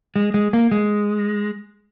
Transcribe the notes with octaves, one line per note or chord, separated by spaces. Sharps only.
G#3
G#3
A#3
G#3